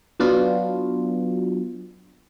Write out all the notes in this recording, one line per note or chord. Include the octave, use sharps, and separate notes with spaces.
F#3 B3 D4 F4 F#4